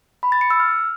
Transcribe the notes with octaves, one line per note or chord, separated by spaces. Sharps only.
B5
A6
C#7
E6
F6